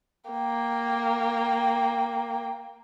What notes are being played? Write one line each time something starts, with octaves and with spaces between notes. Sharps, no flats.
A#3 G5